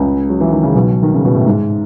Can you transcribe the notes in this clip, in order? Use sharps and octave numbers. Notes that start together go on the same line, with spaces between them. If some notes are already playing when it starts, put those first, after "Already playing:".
Already playing: C#2 C#3
F#3
E3
D#3
C#3
B1 B2
D#3
C#3
B2
A2
G#2